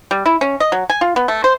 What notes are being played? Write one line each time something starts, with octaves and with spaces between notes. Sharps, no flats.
G3
E4
C#4
D#5
F#3
G#5
F4
B3
A3
C5